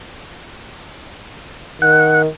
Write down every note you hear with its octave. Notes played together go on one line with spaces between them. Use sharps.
D#3 F#5